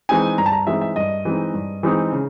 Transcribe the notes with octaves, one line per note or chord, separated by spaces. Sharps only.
E3 G#3 C4 D#4 G#5
G2 A#5
A5
A#5
E3 G#3 C4 D#4 E5
E5
G2 D#5
E3 G#3 C4 D#4
G2
E3 G#3 C4 D#4
C#3